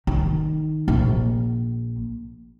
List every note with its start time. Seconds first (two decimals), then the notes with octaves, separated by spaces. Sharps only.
0.07 D#3
0.88 A#1